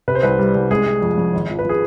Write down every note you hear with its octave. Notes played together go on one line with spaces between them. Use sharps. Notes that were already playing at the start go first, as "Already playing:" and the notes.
C3 B4
C5
C2 B4
G3
C2
G#3 G#4
G#3
F2
F2
G#1
F3
B4
F3 G#4